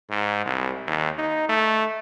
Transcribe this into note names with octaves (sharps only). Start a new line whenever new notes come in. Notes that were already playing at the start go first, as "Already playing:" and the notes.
G#2
C2
D#2
D#4
A3